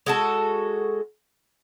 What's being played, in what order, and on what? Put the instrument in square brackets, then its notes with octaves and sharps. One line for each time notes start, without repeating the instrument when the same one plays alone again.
[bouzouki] G#3 F#4 A4